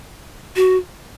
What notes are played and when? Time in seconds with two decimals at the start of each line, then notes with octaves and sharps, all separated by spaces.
0.56 F#4